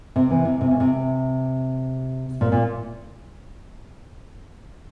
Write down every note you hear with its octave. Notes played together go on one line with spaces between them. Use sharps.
C3
E3
C3
C3
C#3
C3
A#2
A#2